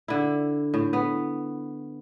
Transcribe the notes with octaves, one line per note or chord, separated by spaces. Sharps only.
D3 E4
A2
B3